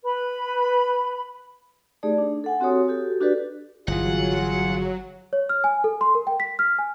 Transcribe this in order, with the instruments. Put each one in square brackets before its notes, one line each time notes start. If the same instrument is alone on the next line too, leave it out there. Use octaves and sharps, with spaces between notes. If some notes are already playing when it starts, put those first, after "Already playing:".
[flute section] B4 B5
[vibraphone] A3 D#4 G4 G#4 D5
D4
A4 F#5 G#5
C4 F#4 G4 A4 C#5 D#6
F#4 G4 A4
D4 F#4 G4 A4 B4 D5
[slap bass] G1 E3 [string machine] F#3 [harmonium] F4 G#4 [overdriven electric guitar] F#5
[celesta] C#5
F6
G#5
A4
C6
A#4
G5
B6
F6
G#5